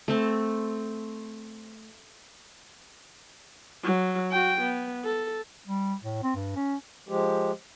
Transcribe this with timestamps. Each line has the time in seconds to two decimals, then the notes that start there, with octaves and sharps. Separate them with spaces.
0.08 A3 C4 A5
3.84 F#3
4.32 F#4 G5
4.61 B3
5.05 A4
5.67 G3
6.04 A2
6.23 C4
6.35 G2
6.56 C#4
7.09 F3 G#3 G4